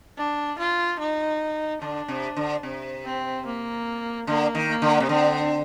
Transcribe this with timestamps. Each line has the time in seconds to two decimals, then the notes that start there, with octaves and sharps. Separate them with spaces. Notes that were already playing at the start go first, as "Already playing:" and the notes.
0.17 D4
0.59 F4
0.99 D#4
1.82 D3 D4
2.08 C3
2.37 D3
2.63 C3
3.05 C4
3.45 A#3
4.27 D3 A#3
4.55 D#3
4.69 A#3
4.82 D3
5.00 C3
5.09 D3 C4